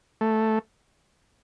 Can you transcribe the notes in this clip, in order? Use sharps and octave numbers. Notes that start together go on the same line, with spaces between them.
A3